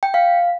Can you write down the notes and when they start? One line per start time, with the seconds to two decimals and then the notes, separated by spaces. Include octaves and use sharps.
0.03 G5
0.14 F5